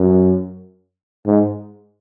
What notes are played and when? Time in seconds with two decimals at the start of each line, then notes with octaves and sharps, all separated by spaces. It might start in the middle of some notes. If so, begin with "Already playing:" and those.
Already playing: F#2
1.26 G#2